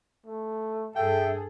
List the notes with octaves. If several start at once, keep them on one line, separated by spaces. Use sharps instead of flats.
A3
G2 G#4 A4 E5 G5